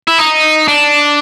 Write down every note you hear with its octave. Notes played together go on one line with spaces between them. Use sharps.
E4
D#4
D4